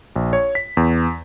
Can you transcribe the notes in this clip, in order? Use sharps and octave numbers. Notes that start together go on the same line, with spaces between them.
A#1
C#5
B6
E2